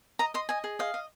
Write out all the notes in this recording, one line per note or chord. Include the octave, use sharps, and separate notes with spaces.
D#5 A#5
D#5 C6
D#5 G#5
G#4
D#5 F5
D#5